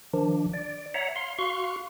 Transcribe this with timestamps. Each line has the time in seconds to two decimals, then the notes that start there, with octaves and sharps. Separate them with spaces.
0.13 D#3 F3 D4
0.54 D5
0.94 C#5 E5 F#5 A#5
1.16 F5 C6
1.38 F#4 F5 C6 C#6